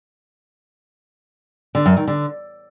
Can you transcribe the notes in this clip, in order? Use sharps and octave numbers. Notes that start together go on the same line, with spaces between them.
D3
F#2
D#3
D3